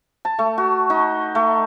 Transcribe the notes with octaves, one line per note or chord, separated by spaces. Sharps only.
A5
A3
F#4
D#4
A3